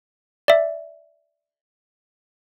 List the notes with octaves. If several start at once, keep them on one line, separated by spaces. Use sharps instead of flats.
D5 E5